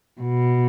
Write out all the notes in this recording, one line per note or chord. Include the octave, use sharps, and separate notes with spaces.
B2